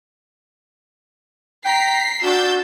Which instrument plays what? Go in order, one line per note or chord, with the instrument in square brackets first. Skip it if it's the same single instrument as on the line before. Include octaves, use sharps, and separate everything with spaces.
[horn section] G5 A#5 [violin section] B6 C7
[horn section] D4 [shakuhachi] F#4 [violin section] E6 G6 A6